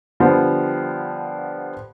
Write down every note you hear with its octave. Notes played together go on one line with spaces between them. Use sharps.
D3 F3 G3 B3 C5